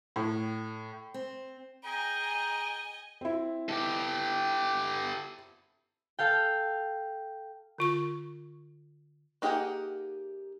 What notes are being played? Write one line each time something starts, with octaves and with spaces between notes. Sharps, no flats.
A2
C4
G#4 D#5 G5 G#5 A#5
C4 E4
G4 A4
A4 F5 G5
D3 F4 C#6
A#3 D#4 G4 G#4 F#5